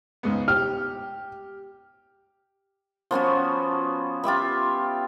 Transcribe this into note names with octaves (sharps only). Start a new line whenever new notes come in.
C#2 G#2 B3
G4 F6
F3 B3 C#4 F#4
F4 G4 E5 B5